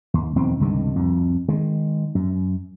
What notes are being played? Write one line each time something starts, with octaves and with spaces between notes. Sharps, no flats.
D#2
B1 E2 D#3 C4
C#2 G2 C3 D#3
C2 F2
D#3 G#3
F#2